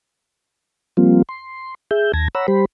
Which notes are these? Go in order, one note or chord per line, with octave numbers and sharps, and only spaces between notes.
F3 G3 A#3 C4 F4
C6
G#4 E5 G6
D#2 A5 G#6 A#6
C#5 F#5 A#5 B5 E6
G3 G4 C5 B5